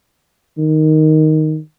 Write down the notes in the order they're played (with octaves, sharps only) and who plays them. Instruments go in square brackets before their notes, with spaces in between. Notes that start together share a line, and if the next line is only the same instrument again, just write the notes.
[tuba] D#3